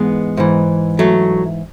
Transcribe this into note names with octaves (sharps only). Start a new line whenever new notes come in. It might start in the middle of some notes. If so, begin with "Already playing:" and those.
Already playing: G#2 E3 G#3 B3
G#2 E3
F#3 A3